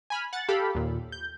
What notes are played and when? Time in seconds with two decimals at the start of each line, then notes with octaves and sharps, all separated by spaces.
0.10 G#5 B5 F6
0.33 F#5 F#6 A6
0.48 G4 A4 F5 B5
0.75 D#2 A#2
1.12 G6